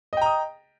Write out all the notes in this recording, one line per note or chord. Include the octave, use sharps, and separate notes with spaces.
D#5 G5 A#5 D#6